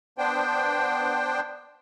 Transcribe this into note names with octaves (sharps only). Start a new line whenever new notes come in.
B3 D4 C5 G5